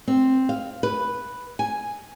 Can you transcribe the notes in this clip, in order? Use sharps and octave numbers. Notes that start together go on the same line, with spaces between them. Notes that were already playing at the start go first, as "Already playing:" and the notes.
C4
F5
B4
G#5